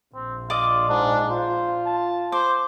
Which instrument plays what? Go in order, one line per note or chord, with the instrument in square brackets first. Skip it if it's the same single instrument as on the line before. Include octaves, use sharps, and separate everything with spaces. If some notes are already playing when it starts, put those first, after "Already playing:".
[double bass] A#1 [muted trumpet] C4
[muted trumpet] F4 [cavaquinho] D5 D#5 D6
[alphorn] G#2 [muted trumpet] D4
[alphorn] F4 [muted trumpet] C5
[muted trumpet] A5
[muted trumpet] C5 [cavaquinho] D6